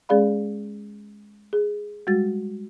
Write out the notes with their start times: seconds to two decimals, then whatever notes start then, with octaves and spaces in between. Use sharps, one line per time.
0.09 G#3 C#4 G#4 D5 F5 B5
1.53 G#4
2.07 G3 G#3 F#4 A6